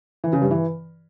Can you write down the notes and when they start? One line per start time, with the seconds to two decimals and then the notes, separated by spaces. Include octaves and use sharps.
0.24 E3
0.33 C#3
0.42 G2
0.51 E3